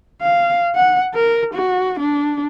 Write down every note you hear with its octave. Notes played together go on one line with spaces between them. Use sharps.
F5
F#5
A#4
F#4
D4